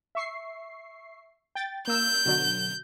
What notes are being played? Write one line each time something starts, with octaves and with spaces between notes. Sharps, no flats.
E5 C#6 C7
G5 A6
A#3 E6 G6
B2 D3 F#3